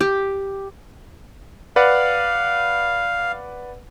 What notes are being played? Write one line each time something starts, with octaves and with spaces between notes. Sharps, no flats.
G4
B4 D5 F5 F#5